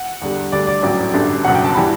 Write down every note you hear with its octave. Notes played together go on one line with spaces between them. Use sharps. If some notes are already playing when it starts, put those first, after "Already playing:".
Already playing: F#5
E2 D3 G3
D2 D3 G3 D5
D5
A1 A2 F#3 D5
G1 F#2 D3 G3
F#1 E2 B2 F#3 F#5
G5
A5
E3 G3 B5